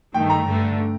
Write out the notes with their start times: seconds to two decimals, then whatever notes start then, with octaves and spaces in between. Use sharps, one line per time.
0.14 G2 D#3 A3 G5
0.30 A#5
0.45 G2 D3 A3